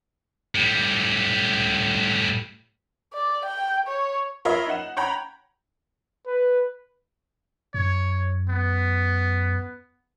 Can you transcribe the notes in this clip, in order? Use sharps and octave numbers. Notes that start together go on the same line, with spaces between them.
A2 G3
D5
G5
C#5
F4 A#4 C#5 D#5 E5 B5
D#4 F#5 E7
C#5 F#5 G5 A#5 B5
B4
F#2 C#5
B3